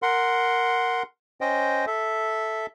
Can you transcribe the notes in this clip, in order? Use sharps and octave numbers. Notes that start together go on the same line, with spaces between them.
A#4 F#5 C6
C#4 C5 D#5 G5
A4 E5